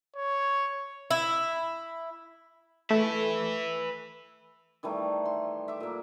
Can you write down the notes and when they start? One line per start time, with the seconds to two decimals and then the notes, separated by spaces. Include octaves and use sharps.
0.16 C#5
1.11 E4
2.90 A3 B4 E5
4.83 D#3 E3 G3 A3
5.25 C6
5.68 E5 D6
5.80 A#2 A#3